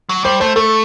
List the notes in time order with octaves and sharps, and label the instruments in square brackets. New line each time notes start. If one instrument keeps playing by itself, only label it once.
[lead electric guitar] F#3
[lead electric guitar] G3 [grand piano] C5
[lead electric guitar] A3 [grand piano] C5
[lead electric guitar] A3 [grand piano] A4